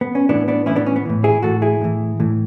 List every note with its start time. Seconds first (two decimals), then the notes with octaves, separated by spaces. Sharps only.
0.01 B3
0.15 C#4
0.29 A2 E3 B3 D4
0.48 B3 D4
0.66 A2 E3 C#4 E4
0.76 B3 D4
0.86 C#4
0.96 B3
1.05 A2 E3
1.24 E4 G#4
1.42 A2 E3 F#4 A4
1.62 E4 G#4
1.81 A2 E3
2.20 A2 E3